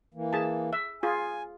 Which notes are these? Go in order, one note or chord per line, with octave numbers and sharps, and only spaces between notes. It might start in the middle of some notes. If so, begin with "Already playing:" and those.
E3 A#3
G#4 A5
E5
F4 G#4 G#5